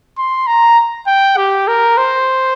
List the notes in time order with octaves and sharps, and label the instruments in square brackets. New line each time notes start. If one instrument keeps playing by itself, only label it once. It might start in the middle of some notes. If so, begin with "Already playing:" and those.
[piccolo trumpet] C6
A#5
G5
G4
A#4
C5